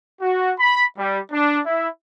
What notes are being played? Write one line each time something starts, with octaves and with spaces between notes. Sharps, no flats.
F#4
B5
G3
D4
E4